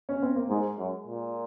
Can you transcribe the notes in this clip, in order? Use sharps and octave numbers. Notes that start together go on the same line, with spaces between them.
C#4
C4
A#3
G#2 G#3
F#2
A#2